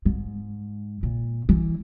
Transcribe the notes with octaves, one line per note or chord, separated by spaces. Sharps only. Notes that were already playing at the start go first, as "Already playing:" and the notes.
G#2
A#2
E3